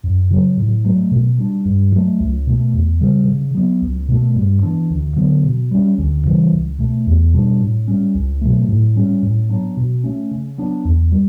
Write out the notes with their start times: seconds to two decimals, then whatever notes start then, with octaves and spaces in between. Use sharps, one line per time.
0.04 F#2
0.30 C#3 F#3
0.57 A2
0.85 F#3 A3
1.11 B2
1.38 G3 D4
1.65 G2
1.92 F#3 A3
2.20 C#2
2.47 B2 A3
2.73 E2
3.01 C#3 G3
3.28 C#3
3.55 F#3 B3
3.82 C#2
4.09 B2 A3
4.36 G2
4.63 E3 B3 D4
4.90 D2
5.16 D3 F#3 B3
5.44 B2
5.71 G3 C#4
5.98 D2
6.25 C#3 E3 G3
6.52 C#2
6.79 B2 A3
7.06 E2
7.33 B2 G3 D4
7.60 A2
7.88 G3 C#4
8.15 C#2
8.42 B2 F#3 A3
8.68 A2
8.96 G3 C#4
9.23 A2
9.49 F#3 B3 D4
9.77 B2
10.04 A3 C#4
10.31 C#3
10.58 F#3 B3 D4
10.85 E2
11.12 G3